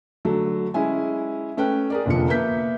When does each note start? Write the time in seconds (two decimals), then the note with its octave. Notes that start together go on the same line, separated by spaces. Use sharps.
0.25 D3 F#3 A3
0.74 G#3 C#4 E4 G#5
1.57 A3 C#4 B4 G5 F#6
1.90 G#4 A#4 D5
2.06 F1 A#2 D3 F3 C#7
2.28 A#3 B3 E5 G6 B6